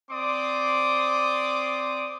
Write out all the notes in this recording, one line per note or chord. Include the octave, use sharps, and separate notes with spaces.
C4 D5 C6 D6 D#6